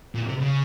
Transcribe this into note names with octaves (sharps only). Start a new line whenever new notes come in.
A#2
C3
C#3